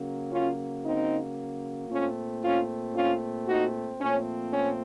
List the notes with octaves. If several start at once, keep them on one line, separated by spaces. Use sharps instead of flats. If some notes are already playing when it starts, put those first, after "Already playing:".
Already playing: C#3 F#3 A#3
C#4 F4
C4 D#4
A#2 A3 C4 C#4 F4
C#4 F4
C#4 F4
D#4 F#4
A#2 F3 A3 C4 C#4
C#4